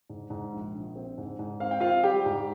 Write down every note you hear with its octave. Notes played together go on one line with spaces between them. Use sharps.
G#2
G#2
A#1
A#1
C4
G#2
G#2
C4 F5
G5
C4 F4 F5
G3 G4 G5
G#2